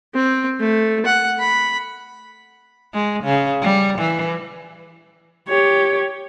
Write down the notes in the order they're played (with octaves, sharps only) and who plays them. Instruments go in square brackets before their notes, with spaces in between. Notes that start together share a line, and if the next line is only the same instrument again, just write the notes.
[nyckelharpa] C4
A3
F#5
B5
[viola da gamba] G#3
C#3
G3
E3
[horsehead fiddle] G4 C#5